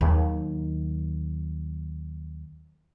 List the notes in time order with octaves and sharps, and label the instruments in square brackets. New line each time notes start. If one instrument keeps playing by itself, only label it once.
[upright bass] D#2 F#3